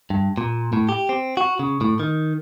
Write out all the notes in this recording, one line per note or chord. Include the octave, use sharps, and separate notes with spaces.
G2
A#2
A2
G4
C4
F#4
C#3
A2
D#3